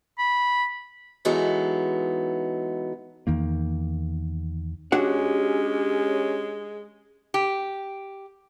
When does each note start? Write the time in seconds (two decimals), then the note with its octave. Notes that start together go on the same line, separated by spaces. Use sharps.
0.19 B5
1.25 E3 F#3 G#3 B3 D#4 A4
3.27 E2 D#3 A#3
4.92 G#3 C#4 D4 F#4 G4 F#5
7.34 G4